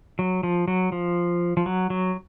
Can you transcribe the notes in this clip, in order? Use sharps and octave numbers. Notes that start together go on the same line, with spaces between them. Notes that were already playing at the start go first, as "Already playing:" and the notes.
F#3
F3
F#3
F3
F3
F#3
F#3